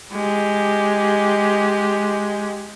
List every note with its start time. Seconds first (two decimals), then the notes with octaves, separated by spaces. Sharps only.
0.12 G#3 G4